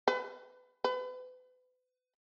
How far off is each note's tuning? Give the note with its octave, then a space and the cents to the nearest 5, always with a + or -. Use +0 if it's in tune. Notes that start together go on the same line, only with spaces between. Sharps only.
B4 +25
B4 +40